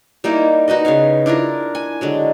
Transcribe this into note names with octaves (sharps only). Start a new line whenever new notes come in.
G3 A#3 D#4 E4
D#4 F#4 B4 D#5
C#3 B3 C#5 F5
D4 E4 F4 A#4
G#5
D3 F#3 G#3